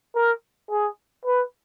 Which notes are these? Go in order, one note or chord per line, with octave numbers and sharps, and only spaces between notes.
A#4
G#4
B4